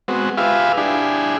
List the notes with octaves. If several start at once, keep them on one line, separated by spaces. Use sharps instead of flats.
G#3 B3 C4 F#4
F4 G4 G#4 B4 E5 F5
D4 E4 G4 G#4